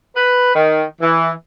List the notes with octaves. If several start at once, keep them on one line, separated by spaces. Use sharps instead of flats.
B4
D#3
E3